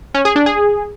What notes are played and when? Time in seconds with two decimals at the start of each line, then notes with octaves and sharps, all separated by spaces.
0.14 C#4
0.25 G#4
0.36 D4
0.46 G#4